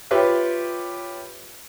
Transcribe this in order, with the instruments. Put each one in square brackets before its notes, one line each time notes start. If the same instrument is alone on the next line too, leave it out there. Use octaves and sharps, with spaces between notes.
[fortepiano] F4 G4 B4 C#5 E5